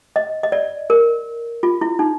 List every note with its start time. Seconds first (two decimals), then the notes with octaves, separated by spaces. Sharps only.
0.16 D#5
0.43 D#5
0.52 D5
0.90 A#4
1.63 F4
1.81 E4
1.99 D#4